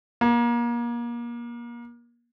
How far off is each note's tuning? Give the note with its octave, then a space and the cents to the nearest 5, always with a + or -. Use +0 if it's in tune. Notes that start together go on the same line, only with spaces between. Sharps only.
A#3 +30